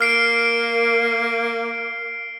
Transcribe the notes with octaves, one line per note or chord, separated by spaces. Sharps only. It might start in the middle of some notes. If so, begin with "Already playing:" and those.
A#3 F6 C7 D7